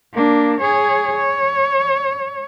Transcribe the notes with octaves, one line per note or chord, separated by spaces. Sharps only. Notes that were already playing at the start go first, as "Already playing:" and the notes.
A#3 D4
G#4 C#5
C#5